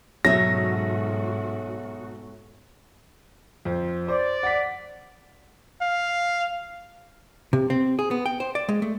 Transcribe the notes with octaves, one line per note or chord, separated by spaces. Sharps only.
G#2 B2 F#3 A3 C#4 F#4 A#6
F2 C5
C5 D5
F#5 B6
F5
C3
C4
G#4
B3
G5
C5
D5
G#3
A3